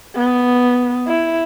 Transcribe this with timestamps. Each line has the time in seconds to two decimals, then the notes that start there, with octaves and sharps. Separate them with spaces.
0.16 B3
1.07 E4